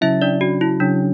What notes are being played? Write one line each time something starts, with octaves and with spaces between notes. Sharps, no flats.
C#3 F#3 C#4 E4 E5
D4 D5
F#4
E4
C#3 F#3 C#4 D4